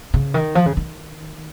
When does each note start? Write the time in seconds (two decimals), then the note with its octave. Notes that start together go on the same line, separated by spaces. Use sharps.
0.14 C#3
0.34 D#3
0.55 F3
0.66 C#3
0.77 D#3